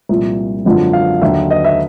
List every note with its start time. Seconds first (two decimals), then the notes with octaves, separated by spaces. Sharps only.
0.09 C2 A#2 F3
0.65 G#1 F#2 D3 F3
0.93 F5
1.21 D#2 D3 F#3 E5
1.51 D#5
1.64 E5